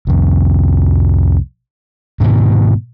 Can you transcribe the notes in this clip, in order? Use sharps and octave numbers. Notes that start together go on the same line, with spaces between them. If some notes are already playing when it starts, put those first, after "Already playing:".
C2 F2
G#2 B2 D3 D#3